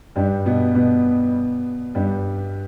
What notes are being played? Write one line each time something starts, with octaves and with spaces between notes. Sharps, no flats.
G2 G3
B2 B3
B2 B3
G2 G3